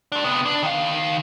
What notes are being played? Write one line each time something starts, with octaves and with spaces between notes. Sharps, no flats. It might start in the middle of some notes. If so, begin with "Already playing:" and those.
G2 D4
C3 B3
D4
D#3 F5